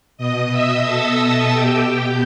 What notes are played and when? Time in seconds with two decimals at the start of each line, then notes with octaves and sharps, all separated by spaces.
0.18 B2 D#5 D#6
0.51 E5 E6
0.85 A4 A5
1.52 B2 G4 G5